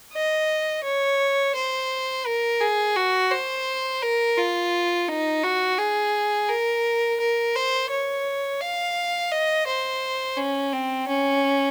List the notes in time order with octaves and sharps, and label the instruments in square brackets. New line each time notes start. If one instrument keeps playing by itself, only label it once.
[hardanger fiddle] D#5
C#5
C5
A#4
G#4
F#4
C5
A#4
F4
D#4
F#4
G#4
A#4
A#4
C5
C#5
F5
D#5
C5
C#4
C4
C#4